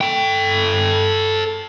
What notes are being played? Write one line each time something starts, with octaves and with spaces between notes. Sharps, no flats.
A4 G5